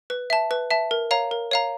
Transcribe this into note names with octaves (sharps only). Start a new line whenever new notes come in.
B4
E5 A5
B4
E5 A5
A#4
C#5 F5 A#5
A#4
C#5 F5 A#5